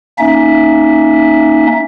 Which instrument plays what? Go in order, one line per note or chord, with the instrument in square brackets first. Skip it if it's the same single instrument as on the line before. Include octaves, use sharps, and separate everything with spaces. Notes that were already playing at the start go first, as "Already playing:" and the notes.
[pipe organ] A#3 C#4 D#4 E5